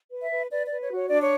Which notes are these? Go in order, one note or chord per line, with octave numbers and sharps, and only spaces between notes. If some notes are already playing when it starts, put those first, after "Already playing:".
B4
E5
B4
B4 D5
D5
B4
C#5
F#4
C#5
D4 D5
C#5